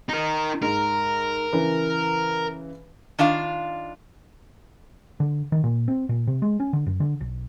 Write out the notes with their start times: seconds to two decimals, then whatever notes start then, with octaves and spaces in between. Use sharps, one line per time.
0.09 D#4 A#4
0.63 G#2 A#4
1.53 C#3 E3 B4
3.19 D#3 D4 F4 F5
5.20 D3
5.52 D#3
5.64 A#2
5.88 C4
6.09 A#2
6.27 C3
6.42 G#3
6.60 C#4
6.73 D3
6.86 F#2
7.00 D3
7.20 B1